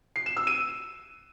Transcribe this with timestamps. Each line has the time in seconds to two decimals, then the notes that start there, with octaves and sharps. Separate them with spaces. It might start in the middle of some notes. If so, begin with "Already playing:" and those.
0.16 C7
0.26 E7
0.37 E6
0.47 D#7